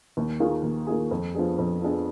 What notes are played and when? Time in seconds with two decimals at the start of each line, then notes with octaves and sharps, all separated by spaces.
0.17 D#2
0.40 D#3 A#3 F4 G#4
0.63 D#2
0.87 D#3 A#3 F4 G#4
1.11 F2
1.35 F3 B3 D4 G#4
1.58 F2
1.81 F3 B3 D4 G#4